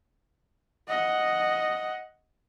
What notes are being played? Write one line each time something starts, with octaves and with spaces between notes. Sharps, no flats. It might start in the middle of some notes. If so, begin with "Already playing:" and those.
D#5 F#5